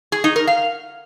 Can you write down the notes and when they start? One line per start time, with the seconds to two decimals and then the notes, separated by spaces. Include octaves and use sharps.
0.12 G#4
0.24 D#4
0.36 A#4
0.47 F5